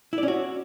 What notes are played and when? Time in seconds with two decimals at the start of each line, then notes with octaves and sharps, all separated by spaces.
0.13 E4
0.18 D5
0.23 C#4
0.28 F#4